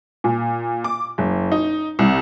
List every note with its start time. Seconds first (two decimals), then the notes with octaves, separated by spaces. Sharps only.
0.24 A#2
0.84 D6
1.18 F#1
1.52 D#4
1.99 C2